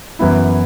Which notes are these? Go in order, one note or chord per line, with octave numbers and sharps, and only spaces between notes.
F#2 E3 B3 E4